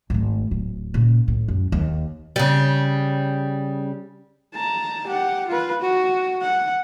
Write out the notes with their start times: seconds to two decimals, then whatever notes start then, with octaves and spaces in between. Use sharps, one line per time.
0.10 G#1 A3
0.51 D1
0.94 A#2 C#3
1.28 A2
1.48 F#2
1.72 D#2
2.36 C#3 G3
4.54 A5 A#5
5.07 G4 F#5
5.48 F4 B4
5.81 F#4
6.41 F#5